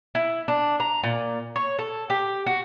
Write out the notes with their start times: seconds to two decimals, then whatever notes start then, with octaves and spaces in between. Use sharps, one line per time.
0.15 E4
0.48 D4
0.80 A#5
1.03 A#2
1.56 C#5
1.79 A4
2.10 G4
2.46 F#4